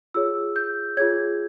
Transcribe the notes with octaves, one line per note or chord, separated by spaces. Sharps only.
F4 G#4 C#5 E6
G6
F4 G#4 C#5 G#6